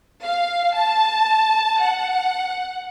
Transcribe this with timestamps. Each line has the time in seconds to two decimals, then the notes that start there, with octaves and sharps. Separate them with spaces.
0.23 F5
0.76 A5
1.81 F#5